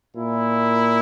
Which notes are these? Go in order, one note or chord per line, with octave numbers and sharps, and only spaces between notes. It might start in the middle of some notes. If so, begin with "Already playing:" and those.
A#2 E4